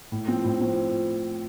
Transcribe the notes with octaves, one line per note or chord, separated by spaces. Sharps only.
A2
F3 C4
A2
F3 C4